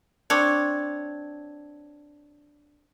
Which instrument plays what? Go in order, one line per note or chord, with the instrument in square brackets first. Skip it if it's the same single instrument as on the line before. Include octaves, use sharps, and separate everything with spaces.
[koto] C4 D4 C#5